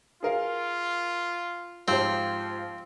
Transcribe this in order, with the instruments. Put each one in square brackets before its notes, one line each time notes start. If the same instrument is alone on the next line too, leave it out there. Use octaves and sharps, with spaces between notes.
[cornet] F4 [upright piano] G#4 A#4 F5
[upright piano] G#2 G4 C5 [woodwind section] F3 [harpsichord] C4